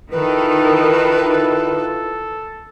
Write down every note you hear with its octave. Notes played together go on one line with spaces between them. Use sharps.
D#3 E4 F4 A4 B4